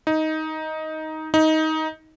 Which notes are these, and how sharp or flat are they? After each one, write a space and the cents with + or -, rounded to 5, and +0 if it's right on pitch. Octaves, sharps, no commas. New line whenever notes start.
D#4 +10
D#4 +15